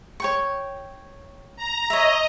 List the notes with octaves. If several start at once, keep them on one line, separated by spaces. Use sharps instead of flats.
C#5 G5 C#6
A#5
C#5 D#5 E5